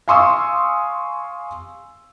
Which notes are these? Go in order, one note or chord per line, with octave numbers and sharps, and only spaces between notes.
F5 G#5 C6 C#6 D#6 E6